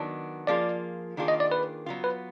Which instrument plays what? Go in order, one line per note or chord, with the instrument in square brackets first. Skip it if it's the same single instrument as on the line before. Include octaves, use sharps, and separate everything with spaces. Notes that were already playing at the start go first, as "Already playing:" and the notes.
Already playing: [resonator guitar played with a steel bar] D#3 F#3 B3 D4
[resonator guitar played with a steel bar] F3 A#3 F4 G#4 [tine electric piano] D5
[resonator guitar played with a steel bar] D#3 A#3 D4 F4 G#4
[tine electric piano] D#5
D5
B4
[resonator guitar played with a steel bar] F#3 B3 F4
[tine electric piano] B4